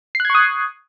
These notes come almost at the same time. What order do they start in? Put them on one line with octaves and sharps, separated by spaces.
C7 F#6 G#6 C#6 D#6